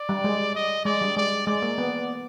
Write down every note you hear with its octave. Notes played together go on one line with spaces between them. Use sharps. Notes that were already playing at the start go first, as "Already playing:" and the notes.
Already playing: D5
G3
G#3
D#5
G#3 D5
G3
G#3 D5
G#3 D5
A#3
B3